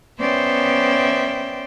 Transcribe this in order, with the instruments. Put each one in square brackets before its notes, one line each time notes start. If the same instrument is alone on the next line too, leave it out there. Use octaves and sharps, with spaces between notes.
[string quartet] B3 C#4 C5 D5 E5 G5